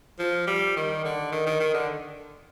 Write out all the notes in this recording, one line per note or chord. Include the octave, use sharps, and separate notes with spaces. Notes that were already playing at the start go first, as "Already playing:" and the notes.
F3
G3
D#3
D3
D#3
D#3
D#3
D3